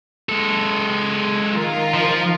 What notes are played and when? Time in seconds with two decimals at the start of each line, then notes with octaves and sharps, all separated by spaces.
0.29 G#3 A4
1.53 D#3 F4 A#4
1.94 F3